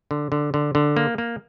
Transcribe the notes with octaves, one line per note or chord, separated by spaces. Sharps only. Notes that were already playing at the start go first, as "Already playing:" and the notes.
D3
D3
D3
D3
A#3
A#3